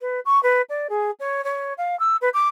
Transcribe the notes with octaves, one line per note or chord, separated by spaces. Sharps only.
B4
C#6
B4
D5
G#4
C#5
C#5
F5
E6
B4
D6